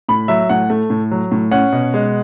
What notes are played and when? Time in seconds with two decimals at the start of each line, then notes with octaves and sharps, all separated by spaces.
0.09 A2 B5
0.28 F#3 E5
0.49 A2 F#5
0.70 A3
0.90 A2
1.11 F#3
1.32 A2
1.52 C#4 F#5
1.73 B2
1.94 G#3